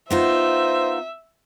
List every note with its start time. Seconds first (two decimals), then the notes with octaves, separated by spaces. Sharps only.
0.10 B3 D#4 F4 C5 E5